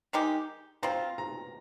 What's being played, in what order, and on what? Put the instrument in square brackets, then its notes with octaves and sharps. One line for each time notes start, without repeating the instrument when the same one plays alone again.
[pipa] D#3 G#3 D#4 G4
[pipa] F3 C4 F4 [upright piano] A#5
[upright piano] A#5